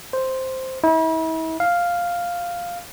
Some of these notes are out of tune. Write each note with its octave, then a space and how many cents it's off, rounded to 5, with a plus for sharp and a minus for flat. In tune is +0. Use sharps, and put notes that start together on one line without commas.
C5 +0
E4 -40
F5 +0